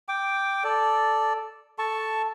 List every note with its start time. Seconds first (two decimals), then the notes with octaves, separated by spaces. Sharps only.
0.09 G5 D6
0.64 A4 D5
1.79 A4 A5 C#6